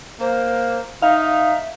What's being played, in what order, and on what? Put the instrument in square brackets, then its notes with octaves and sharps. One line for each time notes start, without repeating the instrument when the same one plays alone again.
[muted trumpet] A#3 [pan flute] C5
[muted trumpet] D#4 [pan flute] E5 [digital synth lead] F5